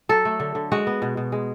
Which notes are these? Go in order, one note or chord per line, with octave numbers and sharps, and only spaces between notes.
F#3 A4
A3
D3
D3
G#3 F#4
B3
B2
B2
G#3